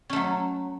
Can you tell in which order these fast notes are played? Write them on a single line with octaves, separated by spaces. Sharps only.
C#4 A3 F#3